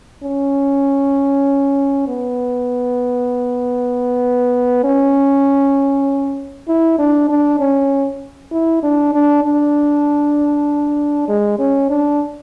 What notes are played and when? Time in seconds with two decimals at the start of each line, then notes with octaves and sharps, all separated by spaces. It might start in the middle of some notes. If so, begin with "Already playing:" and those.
0.23 C#4
2.08 B3
4.84 C#4
6.68 E4
6.99 D4
7.29 D4
7.60 C#4
8.52 E4
8.83 D4
9.13 D4
9.44 D4
11.28 G#3
11.59 C#4
11.90 D4